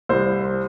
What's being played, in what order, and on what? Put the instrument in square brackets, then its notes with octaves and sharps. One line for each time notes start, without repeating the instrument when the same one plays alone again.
[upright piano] C2 [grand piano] C5